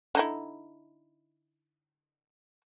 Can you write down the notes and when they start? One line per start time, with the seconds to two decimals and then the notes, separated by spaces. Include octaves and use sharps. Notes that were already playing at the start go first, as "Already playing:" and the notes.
0.15 D3 D#4 E4